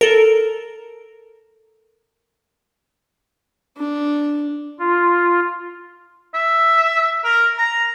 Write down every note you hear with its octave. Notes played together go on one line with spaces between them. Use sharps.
A4 A#4
D4
F4
E5
A#4
A#5